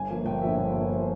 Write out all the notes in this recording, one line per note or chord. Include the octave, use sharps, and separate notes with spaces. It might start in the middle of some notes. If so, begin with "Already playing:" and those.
Already playing: G1 G#5
G2 F3 A#3
G1 G5
G2 F3 A#3 E5
G1
G2 F3 A#3
C5